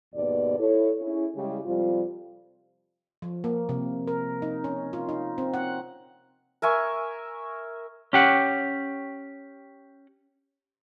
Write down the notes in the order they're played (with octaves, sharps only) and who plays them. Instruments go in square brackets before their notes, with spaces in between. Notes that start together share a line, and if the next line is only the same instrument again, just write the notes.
[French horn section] D#2 G#2 B2 B3 D5
E4 A4 C#5
C#4 E4 G#4
C#3 G3 G#3 E4 G4
F2 C3 F3 G3 F4
[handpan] F3
A#3
C3
A#4
D#4
C#4
F4
D#4
C4
F#5
[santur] A#4 E5 G#5 C#6
[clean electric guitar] C#4 G4 F#5